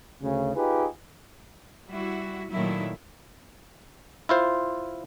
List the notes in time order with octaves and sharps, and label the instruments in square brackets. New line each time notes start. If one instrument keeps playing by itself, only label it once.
[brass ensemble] D2 C#3
D#4 F4 G4 G#4 B4
[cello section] G3 E4 F#4
A#2 D#3 F#3 A3 E4
[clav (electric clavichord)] E4 F4 C5